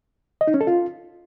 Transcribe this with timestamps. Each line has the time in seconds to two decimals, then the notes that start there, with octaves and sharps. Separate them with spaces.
0.41 D#5
0.48 D#4
0.54 C#4
0.61 A4
0.67 F4